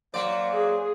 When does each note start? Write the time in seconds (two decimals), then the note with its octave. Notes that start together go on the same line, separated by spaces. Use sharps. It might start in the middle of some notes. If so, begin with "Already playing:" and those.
0.14 F#3 A#3 C5 D5
0.51 G#4